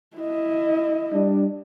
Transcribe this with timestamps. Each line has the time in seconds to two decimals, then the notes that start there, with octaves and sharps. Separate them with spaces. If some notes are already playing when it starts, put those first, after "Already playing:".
0.17 E4 D#5
1.12 G3 D4